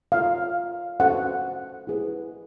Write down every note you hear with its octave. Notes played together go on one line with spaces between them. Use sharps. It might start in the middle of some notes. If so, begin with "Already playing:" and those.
F4 A4 C#5 F5
C#4 F#4 A4 C5 F#5
E4 G#4 B4